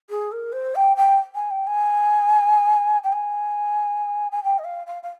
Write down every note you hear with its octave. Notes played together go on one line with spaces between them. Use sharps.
G#4
A#4
C5
G5
G5
G#5
G5
G#5
G5
G#5
G#5
G5
D#5
F5
F5
F5